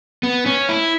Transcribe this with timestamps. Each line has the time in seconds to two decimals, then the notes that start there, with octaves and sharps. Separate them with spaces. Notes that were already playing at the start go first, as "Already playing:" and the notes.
0.23 B3
0.46 C#4
0.69 E4